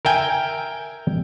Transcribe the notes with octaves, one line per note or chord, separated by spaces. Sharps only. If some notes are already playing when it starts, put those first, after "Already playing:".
A#4 E5 G5 G#5